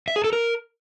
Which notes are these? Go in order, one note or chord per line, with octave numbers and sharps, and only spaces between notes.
E5
G#4
A4
A#4